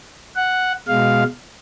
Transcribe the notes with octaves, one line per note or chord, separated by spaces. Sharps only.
F#5
B2 G#3 F5